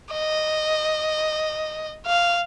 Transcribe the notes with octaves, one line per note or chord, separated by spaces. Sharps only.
D#5
F5